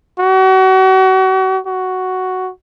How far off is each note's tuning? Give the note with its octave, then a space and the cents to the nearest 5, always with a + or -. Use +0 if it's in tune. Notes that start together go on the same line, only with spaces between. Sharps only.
F#4 +35
F#4 +5